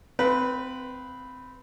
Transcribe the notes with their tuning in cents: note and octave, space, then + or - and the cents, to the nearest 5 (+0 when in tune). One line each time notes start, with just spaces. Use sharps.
C4 -20 B4 +0 F5 +0